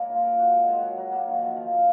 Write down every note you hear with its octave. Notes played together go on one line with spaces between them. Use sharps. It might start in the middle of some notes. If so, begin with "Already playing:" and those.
Already playing: C#3 G#3 A#3
F4
A#4
F#4
G#3
G#3
F#3
F#3
A#3
D#3
F3
F3
A#2